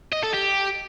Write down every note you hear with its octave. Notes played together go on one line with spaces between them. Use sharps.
D#5
A4
G4